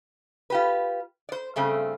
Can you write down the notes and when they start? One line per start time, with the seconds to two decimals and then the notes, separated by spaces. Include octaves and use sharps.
0.50 F4 G4 B4
1.29 C5 D5
1.56 G2 C#3 A3 C4